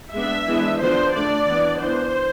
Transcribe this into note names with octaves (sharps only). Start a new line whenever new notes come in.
G#3 B3 D4 E5
E3 G#3 B3 D4
D3 F3 B3 D4 C5
D3 A3 D4 D5
E3 B3 D4
E3 B3 D4 C5